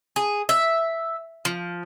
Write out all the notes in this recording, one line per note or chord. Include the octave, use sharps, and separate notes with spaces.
G#4
E5
F3